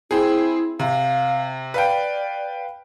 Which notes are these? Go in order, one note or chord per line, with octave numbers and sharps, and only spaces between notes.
C4 E4 G#4
C3 F5
B4 D5 F5 G5